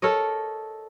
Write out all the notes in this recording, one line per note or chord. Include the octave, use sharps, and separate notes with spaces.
A4 A#4 C#5 D#5